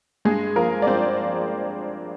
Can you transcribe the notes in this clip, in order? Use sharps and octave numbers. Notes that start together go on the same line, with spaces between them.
G2 G#3 G#4
F3 A#3 A#4
D5
G2 C4 C5